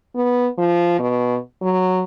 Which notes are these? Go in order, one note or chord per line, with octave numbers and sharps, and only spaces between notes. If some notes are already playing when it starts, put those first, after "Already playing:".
B3
F3
B2
F#3